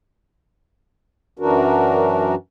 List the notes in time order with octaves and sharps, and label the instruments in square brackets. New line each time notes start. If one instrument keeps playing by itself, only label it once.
[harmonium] F#2 E3 D4 F#4 A#4